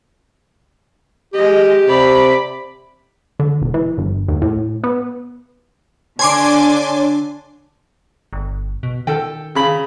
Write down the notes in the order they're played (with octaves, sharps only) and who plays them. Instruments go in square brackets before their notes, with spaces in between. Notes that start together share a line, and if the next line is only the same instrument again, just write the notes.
[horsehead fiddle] G#3 D#5 [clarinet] G4
[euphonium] C3 [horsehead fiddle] D5 B5
[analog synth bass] D3
E1
E3
G1
D#2
A2
B3
[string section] D3 D4 [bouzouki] C#5 [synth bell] G#5 C6 D6
[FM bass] G1
B2
[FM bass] D#3 [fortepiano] A4 G5
[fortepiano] C#3 B5